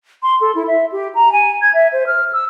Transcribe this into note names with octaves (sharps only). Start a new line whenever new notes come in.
C6
A4
E4
E5
G4
A#5
G#5
G#6
E5
C5
F6
E6